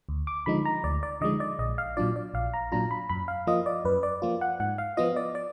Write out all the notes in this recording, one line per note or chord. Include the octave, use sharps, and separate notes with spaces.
D2
D6
D3 F3 G#3 D#4 B5
A#5
D2 D5
D5
D3 F3 G#3 D#4 D#5
D5
A#1 D#5
F5
A#2 F#3 D4 F4 D5
D5
A#1 F5
A#5
A#2 F#3 D4 F4 A#5
B5
F#2 B5
F5
F3 A#3 F4 D#5
D5
F#2 B4
D5
F3 A#3 F4
F#5
G#2 F#5
F5
F3 B3 F4 D#5
D5
D5